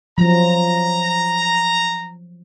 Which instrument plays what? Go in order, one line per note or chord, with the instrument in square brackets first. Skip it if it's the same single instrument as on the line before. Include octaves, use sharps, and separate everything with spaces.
[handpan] F3 F#3 [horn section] A#5